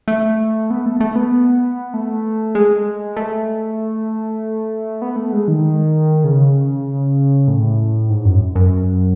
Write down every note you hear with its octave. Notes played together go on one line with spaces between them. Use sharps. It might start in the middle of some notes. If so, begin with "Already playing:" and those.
A3
B3
A3
A3
B3
A3
G#3
A3
B3
A3
G#3
D#3
C#3
A2
G#2
F#2
F#2